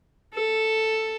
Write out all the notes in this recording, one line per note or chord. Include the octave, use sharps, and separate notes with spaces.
A4